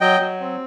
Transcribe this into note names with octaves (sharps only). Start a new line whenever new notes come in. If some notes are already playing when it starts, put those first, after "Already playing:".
F#3 D#5 G5
F#3
C4